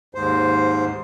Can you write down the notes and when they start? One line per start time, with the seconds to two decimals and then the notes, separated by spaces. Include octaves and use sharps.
0.15 D#2 G#2 C5